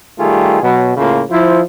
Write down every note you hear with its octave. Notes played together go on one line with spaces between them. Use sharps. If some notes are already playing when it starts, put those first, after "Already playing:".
D#3 G3 A3 F4 G4 G#4
B2 F#3
A2 C#3 A3 A#3 F4
F3 E4 C5